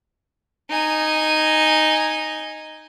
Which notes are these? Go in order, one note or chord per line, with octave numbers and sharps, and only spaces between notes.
D#4 G#5